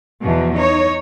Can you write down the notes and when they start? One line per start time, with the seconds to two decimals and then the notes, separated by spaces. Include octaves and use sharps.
0.22 E2 B2 F3
0.56 D#4 C#5